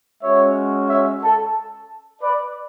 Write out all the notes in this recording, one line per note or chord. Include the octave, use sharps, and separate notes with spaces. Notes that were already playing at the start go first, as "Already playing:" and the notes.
G#3 C#4 F#4 C#5 E5
C#5 E5
A4
B4 D5